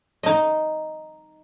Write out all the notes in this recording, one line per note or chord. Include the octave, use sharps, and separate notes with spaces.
D#4 D#5